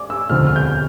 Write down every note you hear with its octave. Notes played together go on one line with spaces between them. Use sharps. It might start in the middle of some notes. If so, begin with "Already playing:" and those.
Already playing: D5 D6
E6
E1 D2 D3 F3 C4 F6
F6
G6